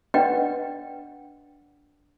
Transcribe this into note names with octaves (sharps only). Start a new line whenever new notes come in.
D4 B4 D5 D#5 F#5 G5